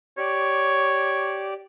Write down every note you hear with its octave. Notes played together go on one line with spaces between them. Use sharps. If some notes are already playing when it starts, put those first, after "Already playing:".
G4 C#5 D5